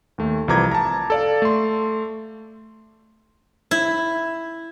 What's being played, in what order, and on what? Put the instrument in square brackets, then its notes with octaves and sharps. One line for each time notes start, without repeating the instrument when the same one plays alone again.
[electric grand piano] D#2 A3
C2 E3 F3 A#5 D6 G#6
A5 A#5
A4 D5 F5
A3 C6
[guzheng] E4